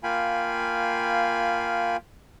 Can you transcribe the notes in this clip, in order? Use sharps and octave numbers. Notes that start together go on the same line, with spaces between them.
A#3 F4 F5 G5 G#5 B5